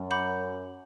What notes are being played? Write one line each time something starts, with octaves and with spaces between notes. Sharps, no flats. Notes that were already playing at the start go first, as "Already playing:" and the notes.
Already playing: F#2
F#5 B5 D6 G6